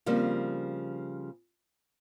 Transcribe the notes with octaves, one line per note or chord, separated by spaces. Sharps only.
C#3 F3 G3 A#3 C4